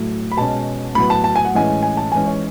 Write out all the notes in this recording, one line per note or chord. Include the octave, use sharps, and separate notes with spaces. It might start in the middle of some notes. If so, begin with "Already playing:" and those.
Already playing: A2 F#3 A3
B5
B2 G#3 C#4 A5
A2 F#3 B3 B5
A5
A5
G#5
F#5
A2 E3 G#3 C#4 G#5
G#5
A5
G#2 E3 G#3 C#4 G#5
C#5